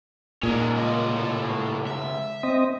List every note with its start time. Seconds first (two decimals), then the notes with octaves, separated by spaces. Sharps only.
0.43 A#2 C#4 D#4 G#4 D5
0.76 C2 C#3 G3 G#3 D#5
1.15 A2 A4
1.87 E5
2.43 C4 D#5